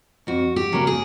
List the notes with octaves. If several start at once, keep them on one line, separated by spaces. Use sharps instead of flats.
F2 F#4
G4
C#3 F#3 A#3
G#4